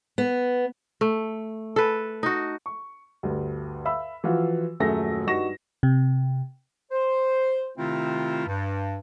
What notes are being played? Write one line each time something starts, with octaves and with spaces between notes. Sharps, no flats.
B3
A3
A4 B4
D#4 F#4
C#6
D2 G2
E5 F5 B5 E6
E3 F3 F4 F#4
D#1 F#2 F#3 A3 G#4 A#6
G2 D#4 F#4 C#6 A#6 E7
C3
C5
C3 D#3 A3 C4 E4 F4
G2